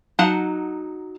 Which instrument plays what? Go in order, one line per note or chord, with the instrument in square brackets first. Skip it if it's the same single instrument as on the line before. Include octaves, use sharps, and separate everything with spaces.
[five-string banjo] F#3 D#4 F#5 A5